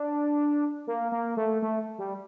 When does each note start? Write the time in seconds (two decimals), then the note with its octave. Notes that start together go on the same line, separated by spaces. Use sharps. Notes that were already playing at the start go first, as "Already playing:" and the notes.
Already playing: D4
0.87 A#3
1.12 A#3
1.37 A3
1.62 A3
1.98 G3